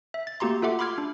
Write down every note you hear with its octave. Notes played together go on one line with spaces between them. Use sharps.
E5
A6
A3 A#3 F#4 G4 A#5 C6
F4 A4 E5 F#5 D6
B5 C6 D6 F6 G#6
D4